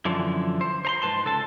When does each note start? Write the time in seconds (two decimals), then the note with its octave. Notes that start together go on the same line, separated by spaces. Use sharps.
0.05 F#2 D3 E3 F3
0.61 C5
0.85 C5 A#5 C6
1.02 G#2 F#3 B4 A5 C6
1.25 C#2 A4 A5